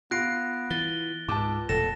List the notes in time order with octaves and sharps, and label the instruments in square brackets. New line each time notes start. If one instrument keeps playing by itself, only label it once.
[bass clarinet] B3 [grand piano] F4 C7 [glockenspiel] F#6 A#6 D7
[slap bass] E3 [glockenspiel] A6 G7
[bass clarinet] C#2 [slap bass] G#2 [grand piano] A5 D6
[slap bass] E1 A#2 [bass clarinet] A4 [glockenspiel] A#6 E7